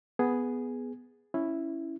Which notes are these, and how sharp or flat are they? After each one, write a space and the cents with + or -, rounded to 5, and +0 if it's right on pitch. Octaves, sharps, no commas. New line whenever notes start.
B3 +0 G#4 +0
C#4 +0 E4 +0